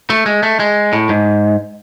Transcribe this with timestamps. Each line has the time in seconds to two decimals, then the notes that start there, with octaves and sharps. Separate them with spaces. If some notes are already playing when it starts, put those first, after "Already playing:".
0.10 A3
0.26 G#3
0.43 A3
0.60 G#3
0.93 A2
1.09 G#2